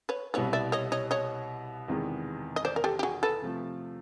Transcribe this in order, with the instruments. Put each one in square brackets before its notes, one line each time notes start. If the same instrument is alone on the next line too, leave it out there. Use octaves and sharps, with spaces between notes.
[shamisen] B4 C#5
[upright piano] C2 B2 G3 B3 E4 [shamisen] B4 C#5
[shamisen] D5 E5
C#5 D#5
C#5 D#5
C#5 D#5
[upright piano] E2 C3 D#3 G#3 B3
[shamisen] D#5
C5 D5
A#4
G4 A4
G4
F#4 G#4
A4 B4
[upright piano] C3 F3 A3